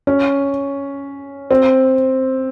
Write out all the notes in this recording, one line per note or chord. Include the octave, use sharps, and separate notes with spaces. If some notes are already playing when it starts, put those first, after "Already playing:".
C#4
C4